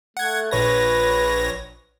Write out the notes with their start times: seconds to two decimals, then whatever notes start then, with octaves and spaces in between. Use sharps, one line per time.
0.17 A3 F#5 G#6
0.51 A#1 B4 C#5 A#6